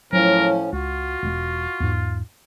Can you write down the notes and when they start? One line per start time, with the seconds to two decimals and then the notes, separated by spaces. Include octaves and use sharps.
0.13 A2 F3 F#3 C#4 A#4
0.73 C#2 F4 F#4
1.23 E1 G#3
1.80 E2 G#2